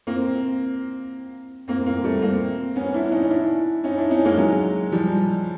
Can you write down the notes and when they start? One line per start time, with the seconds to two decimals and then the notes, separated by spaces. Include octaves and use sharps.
0.07 A#3 C4
1.68 A#3 C4
1.86 A#3 C4
2.04 G3 A3
2.22 A#3 C4
2.76 B3 C#4
2.94 D4 E4
3.12 C#4 D#4
3.30 D4 E4
3.84 C#4 D#4
3.97 D4 E4
4.11 C#4 D#4
4.25 G#3 A#3
4.38 F#3 G#3
4.92 F3 G3